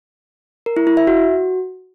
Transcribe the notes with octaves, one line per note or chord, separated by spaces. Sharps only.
A#4
E4
E4
E5
F#4